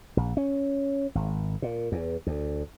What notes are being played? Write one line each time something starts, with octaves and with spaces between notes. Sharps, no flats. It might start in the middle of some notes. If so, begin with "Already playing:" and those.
A#1
C#4
G#1
A#2
E2
D2